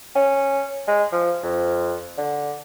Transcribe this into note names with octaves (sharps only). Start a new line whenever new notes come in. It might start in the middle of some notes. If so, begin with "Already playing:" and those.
C#4
G#3
F3
F2
D3